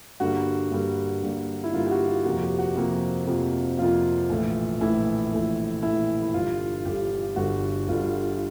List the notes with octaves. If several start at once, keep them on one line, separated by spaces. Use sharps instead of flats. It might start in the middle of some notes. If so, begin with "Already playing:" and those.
G2 D3 G3 A#3 F#4
G2 D3 G3 A#3
G2 D3 G3 A#3
E4
G2 D3 G3 A#3 F4
G4
F#4
F4
F2 C3 F3 A#3 F#4
G4
F#4
F2 C3 F3 A#3
F2 C3 F3 A#3
F2 C3 F3 A#3 F4
A#1 A2 E3 A3
A#1 A2 E3 A3 E4
A#1 A2 E3 A3
A#1 A2 E3 A3 E4
E4
G1 G2 D3 G3 F4
G1 G2 D3 G3 G4
G1 G2 D3 G3 F#4
G1 G2 D3 G3 F4